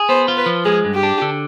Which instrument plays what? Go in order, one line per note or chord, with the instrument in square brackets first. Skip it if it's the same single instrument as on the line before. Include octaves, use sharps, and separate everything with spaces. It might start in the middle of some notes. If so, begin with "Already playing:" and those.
Already playing: [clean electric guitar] G#4
[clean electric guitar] B3 [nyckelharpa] C5
[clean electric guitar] F4
[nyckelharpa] B4
[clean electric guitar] F3
[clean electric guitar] G#3 [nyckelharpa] G#4
[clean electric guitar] G2
[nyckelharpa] G4
[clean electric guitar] D4
D3